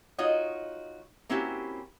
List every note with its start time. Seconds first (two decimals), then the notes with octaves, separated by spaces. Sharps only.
0.18 D#4 F4 F#4 C#5 D#5
1.29 A#3 C4 C#4 E4 F#4 G4